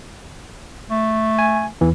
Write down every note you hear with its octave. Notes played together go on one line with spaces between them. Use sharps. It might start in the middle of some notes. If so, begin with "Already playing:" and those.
A3
G#5
E2 E3